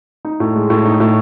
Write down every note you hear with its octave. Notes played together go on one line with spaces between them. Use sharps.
D#4
A2
G#3
A2
D#4
A2